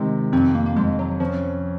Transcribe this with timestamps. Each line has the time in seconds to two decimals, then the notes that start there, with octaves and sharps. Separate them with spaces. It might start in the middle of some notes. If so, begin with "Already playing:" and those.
Already playing: C3 D#3 G#3
0.33 F2 C4
0.55 A#3
0.66 A#3
0.76 F2 G#3
0.99 F#3
1.20 F3 C#4